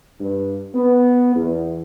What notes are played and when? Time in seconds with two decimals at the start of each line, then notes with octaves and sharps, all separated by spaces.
0.20 G2
0.74 B3
1.35 E2